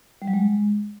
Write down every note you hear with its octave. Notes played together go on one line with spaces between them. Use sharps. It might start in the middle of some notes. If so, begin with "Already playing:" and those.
G3
F#3
G#3